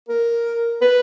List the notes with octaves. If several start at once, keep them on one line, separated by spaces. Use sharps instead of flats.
A#4
B4